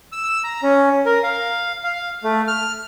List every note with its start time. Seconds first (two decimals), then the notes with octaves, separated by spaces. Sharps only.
0.12 E6
0.24 E6
0.44 A#5
0.63 C#4
1.06 A#4
1.23 F5
1.84 F5
2.24 A3
2.48 F6